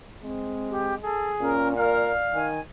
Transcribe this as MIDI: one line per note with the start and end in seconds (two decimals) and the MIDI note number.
0.23 1.06 56
0.23 0.95 60
0.69 0.94 67
1.03 1.53 68
1.03 1.30 69
1.41 2.18 46
1.41 1.74 61
1.41 1.68 70
1.77 2.11 70
1.77 2.39 74
1.77 2.49 77
2.34 2.59 51
2.34 2.60 80